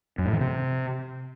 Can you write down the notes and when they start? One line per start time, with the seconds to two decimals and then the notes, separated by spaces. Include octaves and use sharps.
0.18 F#2
0.26 A2
0.33 E3
0.41 C3